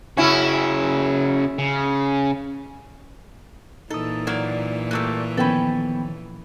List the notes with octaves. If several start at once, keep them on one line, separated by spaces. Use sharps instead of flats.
C#3 C#4 E4 F#4
C#3
A#2 E3 D#4 A4 D#6
F#3 A#3 D5
G3 A3 A#3 E6 F#6
D#3 F3 B3 C#4 A4 G5 B5 A6